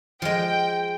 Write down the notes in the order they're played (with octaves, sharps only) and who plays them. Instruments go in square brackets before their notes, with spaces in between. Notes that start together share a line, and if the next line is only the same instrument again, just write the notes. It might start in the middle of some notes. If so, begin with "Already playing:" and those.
[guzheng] F3 G#3 [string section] G5